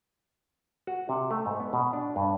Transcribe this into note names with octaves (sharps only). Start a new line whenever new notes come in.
F#4
C3
A3
G#2
B3
B2
D4
G2